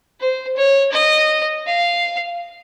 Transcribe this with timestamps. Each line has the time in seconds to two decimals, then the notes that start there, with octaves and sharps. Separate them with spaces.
0.20 C5
0.56 C#5
0.92 D#5
1.66 F5